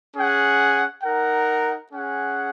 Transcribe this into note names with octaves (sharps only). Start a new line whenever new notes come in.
C#4 G#4 F#5
D#4 A#4 F#5
C#4 G#4 F#5